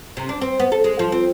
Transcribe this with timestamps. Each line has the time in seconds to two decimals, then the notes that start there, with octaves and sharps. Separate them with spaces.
0.17 C3
0.29 D4
0.41 C4
0.60 B3
0.72 A4
0.84 G#3
0.99 F3
1.12 C4